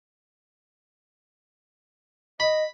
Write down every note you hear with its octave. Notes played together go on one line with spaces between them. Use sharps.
D#5 B5